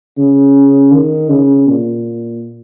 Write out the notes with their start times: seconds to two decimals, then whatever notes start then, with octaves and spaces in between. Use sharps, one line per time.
0.17 C#3
0.92 D#3
1.29 C#3
1.67 A#2